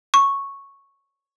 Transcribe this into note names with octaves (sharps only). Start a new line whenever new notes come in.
C#6